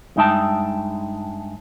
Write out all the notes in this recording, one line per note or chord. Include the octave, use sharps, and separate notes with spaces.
G2 G#3 D#4 E5 G5 A5